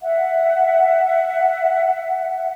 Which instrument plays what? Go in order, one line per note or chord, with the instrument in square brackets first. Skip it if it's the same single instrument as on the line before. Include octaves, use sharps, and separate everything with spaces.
[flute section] E5 F#5